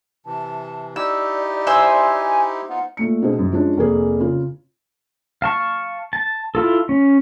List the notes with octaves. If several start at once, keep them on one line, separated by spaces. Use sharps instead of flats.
C3 E3 A5
D#4 E4 G4 D5 E6
C5 E5 G#5 E6
B3 D#4 F4 F#5
A#2 A3 C#7
B2 C4 D4 G#4
F#2
F3 G#3 C#4 D4
F1 A#3 G#4
C#3 F4
F5 A5 C#6
A5
E4 F4 A4
C#4